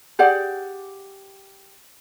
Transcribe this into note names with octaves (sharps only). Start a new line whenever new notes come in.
G4 G#4 D5 F#5